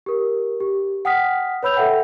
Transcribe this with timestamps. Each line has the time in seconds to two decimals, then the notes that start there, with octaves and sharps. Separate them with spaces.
0.06 G4 A#4
0.60 G4
1.05 F#5 G5 D#6 F6 B6
1.63 B4 C#5 B5 E6 G6 F7
1.77 A4 E5 F#5 G5